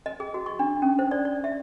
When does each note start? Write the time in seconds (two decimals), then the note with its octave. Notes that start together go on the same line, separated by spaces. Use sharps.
0.06 D#5
0.20 G#4
0.34 F#4
0.46 C#6
0.59 D4
0.82 C#4
0.99 C5
1.11 D5
1.25 D5
1.44 E5